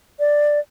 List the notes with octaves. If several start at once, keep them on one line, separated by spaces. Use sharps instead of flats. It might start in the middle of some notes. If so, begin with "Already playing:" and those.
D5